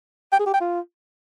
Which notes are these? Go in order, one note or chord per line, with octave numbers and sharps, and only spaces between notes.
G5
G#4
G4
G5
F4